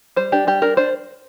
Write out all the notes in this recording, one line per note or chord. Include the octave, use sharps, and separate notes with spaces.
G3 C5
D4 G4
G3 G4
D4 A#4
D4 C5